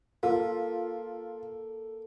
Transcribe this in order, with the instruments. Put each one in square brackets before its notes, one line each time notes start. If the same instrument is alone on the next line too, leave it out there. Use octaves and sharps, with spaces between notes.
[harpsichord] A#3 [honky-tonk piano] F4 [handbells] A4